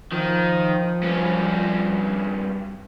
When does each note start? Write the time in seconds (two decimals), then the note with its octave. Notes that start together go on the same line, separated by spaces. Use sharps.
0.12 D#3 F3
1.03 G2 C#4